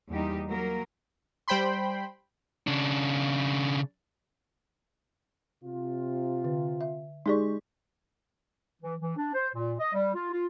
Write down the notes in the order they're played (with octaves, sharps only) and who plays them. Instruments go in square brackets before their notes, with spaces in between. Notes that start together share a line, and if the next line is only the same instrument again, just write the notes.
[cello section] E2 G3 A#3 D#4 G4
F#3 A#3 A#4
[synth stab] G3 C5 G5 B5 C6
[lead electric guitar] C#3 D4
[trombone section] C3 F4
[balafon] D3
E5
[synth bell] G#3 G4 C#6 [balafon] D#4 G#4 D5
[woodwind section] E3
E3
D4
C5
A#2
D#5
G3
F4
F4